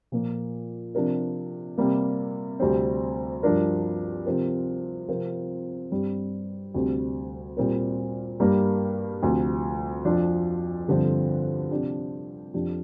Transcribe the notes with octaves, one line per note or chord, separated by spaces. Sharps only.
A#2 F3 A#3
C3 F3 D4 G4 A#4
C3 G3 A#3
D2 C3 G3 C4
G2 F3 D4 A#4
C3 F3 C4 A#4
C3 F3 C4 F4 A#4
G2 G3 C4
D2 C3 G3 C4 G4
A#2 G3 C4 A#4
G2 G3 A#3 G4 A#4
D2 C3 F3
F2 F3 D4
G2 D3 F3 C4
C3 F3 D4 G4
F2 F3 D4 G4